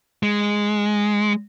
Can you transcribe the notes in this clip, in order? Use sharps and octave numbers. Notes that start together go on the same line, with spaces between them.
G#3